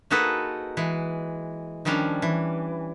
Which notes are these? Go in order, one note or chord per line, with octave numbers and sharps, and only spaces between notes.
A#3 D#4 F#4 G#4 A4 B4
E3 G#3
D#3 F3 G3 C#4 D4
E3